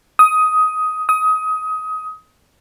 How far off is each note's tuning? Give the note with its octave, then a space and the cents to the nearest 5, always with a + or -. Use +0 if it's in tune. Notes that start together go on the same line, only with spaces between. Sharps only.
D#6 +15
D#6 +25